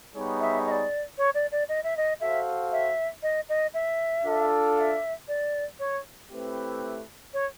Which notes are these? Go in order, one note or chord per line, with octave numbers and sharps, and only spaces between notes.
G3 B3 D#4 G#4 C#5
E5
D#5
D5
C#5
D5
D5
D#5
E5
D#5
F#4 A4 C5 E5 F5
E5
D#5
D#5
E5
D4 F4 A4
F5
E5
D5
C#5
A3 C4 E4 G4 B4
C#5